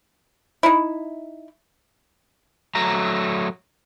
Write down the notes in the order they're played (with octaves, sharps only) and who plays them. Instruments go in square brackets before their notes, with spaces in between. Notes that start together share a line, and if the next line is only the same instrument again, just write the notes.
[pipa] D#4 E4
[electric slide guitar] F#3 A3 A#5